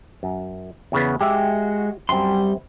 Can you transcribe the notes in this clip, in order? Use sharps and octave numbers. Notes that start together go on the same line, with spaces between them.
F#2
E2 C#3 B3
G#3 F#4 G4 E5
F#2 G3 C4 C6